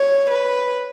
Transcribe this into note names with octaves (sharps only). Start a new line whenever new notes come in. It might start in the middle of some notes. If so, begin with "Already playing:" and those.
Already playing: C#5
B4